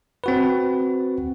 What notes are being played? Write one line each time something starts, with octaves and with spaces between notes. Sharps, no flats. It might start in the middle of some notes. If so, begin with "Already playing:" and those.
C4 F#4 B4